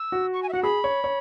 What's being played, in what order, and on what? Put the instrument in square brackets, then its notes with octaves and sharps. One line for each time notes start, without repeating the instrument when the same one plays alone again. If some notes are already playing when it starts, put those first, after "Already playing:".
Already playing: [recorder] E6
[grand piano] F#4
[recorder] C#6
G#5
E5
[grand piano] F#4 [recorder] F#5
[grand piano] G#4 [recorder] B5
[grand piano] C#5
C#5